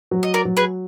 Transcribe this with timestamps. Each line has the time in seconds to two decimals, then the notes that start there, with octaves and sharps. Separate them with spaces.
0.11 F#3
0.23 D#5
0.34 A#4 D5
0.45 F#3
0.57 G#4 B4